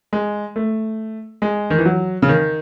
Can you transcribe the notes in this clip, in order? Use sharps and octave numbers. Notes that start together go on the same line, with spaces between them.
G#3
A3
G#3
D#3
E3
F#3
C#3
D#3